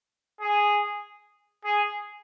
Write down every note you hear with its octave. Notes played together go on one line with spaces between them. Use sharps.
G#4
G#4